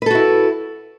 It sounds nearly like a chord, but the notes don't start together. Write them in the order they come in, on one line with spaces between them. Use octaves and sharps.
B4 A4 F#4 E4